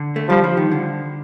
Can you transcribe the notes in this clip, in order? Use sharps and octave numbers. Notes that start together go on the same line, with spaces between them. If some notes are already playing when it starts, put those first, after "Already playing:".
Already playing: D3
A3
F3 G3
F3
D#3
D3